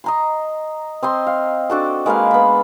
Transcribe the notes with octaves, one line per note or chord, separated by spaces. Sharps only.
D#5 A#5 C6
C4 D#5 C6
F5
D4 F#4 A4
G#3 A#3 B4 F5
B3 B5